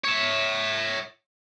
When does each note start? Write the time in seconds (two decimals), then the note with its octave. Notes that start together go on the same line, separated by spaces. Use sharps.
0.05 C#5 E5